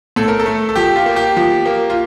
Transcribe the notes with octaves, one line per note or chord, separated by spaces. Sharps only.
A2 A4
A#4
A4
A3
A4
F3 G4
F4
A#3
G4
F3
A#3
F4